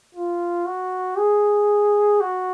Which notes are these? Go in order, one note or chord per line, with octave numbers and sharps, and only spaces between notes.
F4
F#4
G#4
F#4